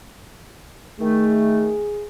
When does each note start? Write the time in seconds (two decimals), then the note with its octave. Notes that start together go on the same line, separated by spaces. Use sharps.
1.00 D#3 A3 G#4